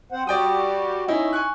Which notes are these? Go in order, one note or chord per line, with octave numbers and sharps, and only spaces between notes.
C4 C5 F#5
G3 F#4 G4 D5 G5 D#6
C#4 D#4 E4
G#5 C#6 F#6